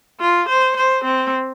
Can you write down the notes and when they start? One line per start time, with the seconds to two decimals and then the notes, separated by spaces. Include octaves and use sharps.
0.20 F4
0.49 C5
0.76 C5
1.04 C4